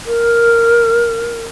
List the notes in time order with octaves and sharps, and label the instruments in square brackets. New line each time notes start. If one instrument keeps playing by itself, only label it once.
[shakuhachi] A#4